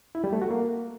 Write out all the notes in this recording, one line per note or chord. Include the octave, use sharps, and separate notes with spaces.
E4
G3
A3
F#4
A#3